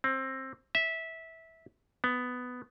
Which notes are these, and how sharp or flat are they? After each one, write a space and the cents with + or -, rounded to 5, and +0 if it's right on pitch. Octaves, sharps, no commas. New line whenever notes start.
C4 +20
E5 -15
B3 +10